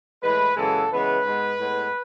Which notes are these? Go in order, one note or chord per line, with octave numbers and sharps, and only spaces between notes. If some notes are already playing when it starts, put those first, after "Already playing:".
A2 E3 G#3 B4
F#2 C#3 E3 G#3 B3 A4
C#3 E3 G#3 B3 B4
G#2 G#3 B3
A2 G#3 B3